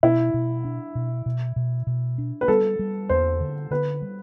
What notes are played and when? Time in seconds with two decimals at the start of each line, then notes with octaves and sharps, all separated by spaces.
0.03 B2 E4
0.34 B2
0.65 D4
0.95 B2
1.26 B2
1.56 B2
1.87 B2
2.18 D4
2.41 B4
2.48 G3 A4
2.79 G3
3.09 E2 C5
3.40 D3
3.71 D3 B4
4.02 G3